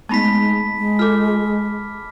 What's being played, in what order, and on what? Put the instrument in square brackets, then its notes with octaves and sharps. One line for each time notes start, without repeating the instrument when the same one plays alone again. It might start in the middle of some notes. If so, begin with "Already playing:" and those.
[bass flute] G#3 [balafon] A3 B3 D#4 [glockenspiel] A5 B5 B6
[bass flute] G#3
[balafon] F4 A4 [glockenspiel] D6 F6